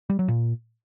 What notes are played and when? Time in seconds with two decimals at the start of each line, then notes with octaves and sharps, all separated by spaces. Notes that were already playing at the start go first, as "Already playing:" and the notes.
0.10 G3
0.19 F#3
0.28 A#2